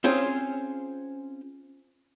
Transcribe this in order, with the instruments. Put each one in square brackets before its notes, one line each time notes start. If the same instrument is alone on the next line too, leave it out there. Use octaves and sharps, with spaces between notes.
[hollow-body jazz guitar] C4 C#4 F4 G#4 C5